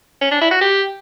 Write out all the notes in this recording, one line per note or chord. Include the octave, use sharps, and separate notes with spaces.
C#4
D4
E4
F#4
G4